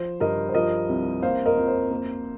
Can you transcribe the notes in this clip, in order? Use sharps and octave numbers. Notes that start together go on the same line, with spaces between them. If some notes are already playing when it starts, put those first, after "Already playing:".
Already playing: F3 C5
G2 A#4 D#5
C5
F3 A#4 D#5
C2
A#3 C5 F5
A#4 D#5
F2
C5
A#3